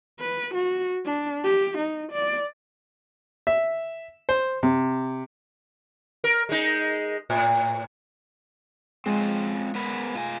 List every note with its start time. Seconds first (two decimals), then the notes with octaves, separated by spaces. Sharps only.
0.20 B4
0.54 F#4
1.06 D4
1.44 G4
1.78 D#4
2.12 D5
3.47 E5
4.29 C5
4.63 C3
6.24 A#4
6.49 G#3 D#4
7.30 A2
9.06 G#3 C4 C#4 F4
9.75 B3 A#4 B4
10.15 F4 G#5